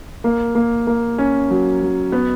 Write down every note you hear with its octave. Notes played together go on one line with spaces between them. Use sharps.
A#3
A#3
A#3
C#4
F#3
F#3
B3